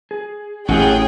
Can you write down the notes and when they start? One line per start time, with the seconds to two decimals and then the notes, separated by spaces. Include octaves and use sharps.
0.11 G#4
0.68 A1 C#4 F#4 G#4 C#5 F#5 G5